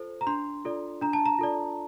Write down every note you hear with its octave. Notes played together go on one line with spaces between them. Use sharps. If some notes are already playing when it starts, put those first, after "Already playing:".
Already playing: F4 A4 C5
A#5
D4 C6
F4 A4 D5
D4 A#5
A5
A#5
F4 A4 D5